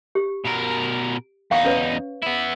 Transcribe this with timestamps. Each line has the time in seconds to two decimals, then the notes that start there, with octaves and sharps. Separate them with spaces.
0.15 G4
0.45 B2 A#4
1.51 E2 D#4 F5 G5 C#6
1.65 C#4 B4 C#5
2.23 B3 E4